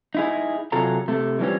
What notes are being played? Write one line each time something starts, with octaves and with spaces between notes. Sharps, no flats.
D#4 E4 G#4
C3 F#3 F4 G#4 A4 A#5
C3 A3
E3 F3 G3 C4 C#4